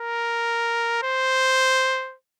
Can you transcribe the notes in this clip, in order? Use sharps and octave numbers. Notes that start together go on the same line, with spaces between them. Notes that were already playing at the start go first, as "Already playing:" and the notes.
Already playing: A#4
C5